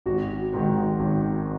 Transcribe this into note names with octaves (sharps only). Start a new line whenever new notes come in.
G#1 F#4
G#2 D#3
G#1